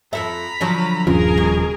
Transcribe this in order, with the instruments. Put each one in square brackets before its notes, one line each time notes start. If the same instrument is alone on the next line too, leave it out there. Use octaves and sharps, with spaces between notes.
[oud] F2 A4 E5 [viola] A#5 B5
[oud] D3 F3 F#3
[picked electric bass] D#1 C#3 F3 [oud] G2 [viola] G#4 A#4
[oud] B2